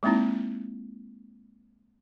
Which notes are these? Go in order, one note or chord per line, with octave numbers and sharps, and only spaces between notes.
G#3 A#3 C4 D#4 E4